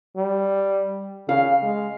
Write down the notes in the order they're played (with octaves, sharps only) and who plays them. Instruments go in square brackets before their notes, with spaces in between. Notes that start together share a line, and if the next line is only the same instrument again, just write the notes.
[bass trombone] G3
[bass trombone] C#3 [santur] F5
[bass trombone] G#3